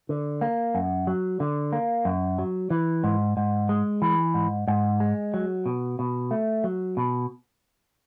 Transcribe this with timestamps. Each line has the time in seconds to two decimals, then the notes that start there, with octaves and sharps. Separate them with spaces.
0.09 D3
0.41 A#3
0.75 F#2
1.07 F#3
1.40 D3
1.73 A#3
2.05 F#2
2.38 F#3
2.70 E3
3.04 G#2
3.37 G#2
3.69 G#3
4.02 E3
4.34 G#2
4.68 G#2
5.00 G#3
5.34 F#3
5.66 B2
5.99 B2
6.31 A3
6.64 F#3
6.97 B2